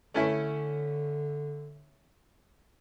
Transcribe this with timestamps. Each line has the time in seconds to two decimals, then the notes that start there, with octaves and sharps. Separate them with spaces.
0.14 D3 A3 C#4 E4